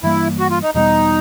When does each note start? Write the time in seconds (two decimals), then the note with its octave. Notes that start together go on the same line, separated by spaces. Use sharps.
0.03 G2 E3 G3 A#3 E4
0.39 F#4
0.50 F4
0.62 D#4
0.74 E2 B2 G3 B3 D#4